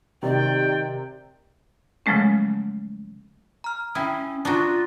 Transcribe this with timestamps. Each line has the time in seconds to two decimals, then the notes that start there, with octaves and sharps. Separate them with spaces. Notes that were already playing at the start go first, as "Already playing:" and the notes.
0.23 C3 D#3 D5 G5
2.06 C#3 F3 F#3 G#3 A3 C#4
3.64 A#5 F6
3.95 C#4 E4 G5 D#6
4.45 D4 F4 F#4 A#5 D#6